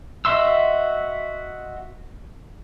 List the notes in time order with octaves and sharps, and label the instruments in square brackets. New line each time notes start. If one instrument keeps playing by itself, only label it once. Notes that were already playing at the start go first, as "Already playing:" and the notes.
[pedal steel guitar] F#4 D#5 E5 C6 E6